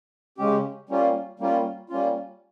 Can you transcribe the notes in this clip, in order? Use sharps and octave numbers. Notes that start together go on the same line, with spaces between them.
C#3 G#3 C#4 G4
G3 A#3 C#4 F4
G3 A#3 C#4 F4
G3 A#3 C#4 F4